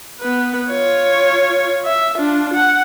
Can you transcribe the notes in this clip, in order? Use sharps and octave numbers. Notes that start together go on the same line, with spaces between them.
B3 B4
F4 C#5
E5
D4 F4
F#5